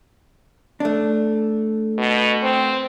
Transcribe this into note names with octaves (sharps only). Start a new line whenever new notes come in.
A3 D4
B2
C4